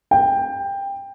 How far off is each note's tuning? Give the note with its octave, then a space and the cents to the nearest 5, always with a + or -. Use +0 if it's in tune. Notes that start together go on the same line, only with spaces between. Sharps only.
G5 +15